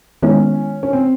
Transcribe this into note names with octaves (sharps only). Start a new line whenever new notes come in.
D#3 G#3 B3 C#4 E4
C#4
C4